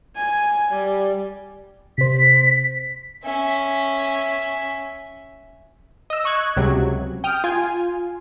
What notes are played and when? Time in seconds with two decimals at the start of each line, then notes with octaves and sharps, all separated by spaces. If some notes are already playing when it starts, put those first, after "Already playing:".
0.16 G#5
0.72 G3
1.98 C3 C5 B6
3.24 C#4 E5
6.10 D#5 E6
6.24 D#5 C#6 F#6 G#6
6.57 C#2 C3 F#3
7.24 G5 D#6 F6
7.44 F4 G#5